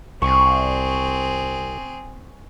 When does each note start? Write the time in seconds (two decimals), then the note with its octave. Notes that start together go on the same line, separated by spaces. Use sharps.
0.22 C2 C4 G#4 C#6